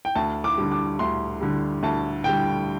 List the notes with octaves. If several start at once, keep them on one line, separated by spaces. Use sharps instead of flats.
G5
D2 A5
D6
D3 G3
D6
D2 C6
D3 G3
D2 A5
D3 G3 G5